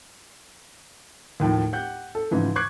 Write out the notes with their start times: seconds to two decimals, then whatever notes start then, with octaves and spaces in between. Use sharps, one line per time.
1.40 D#2 A2 D#3 F3
1.73 G4 F#5 G6
2.15 A4
2.31 G#2 C#3 E3 F3
2.56 C#6 D6 F#6 G#6 C7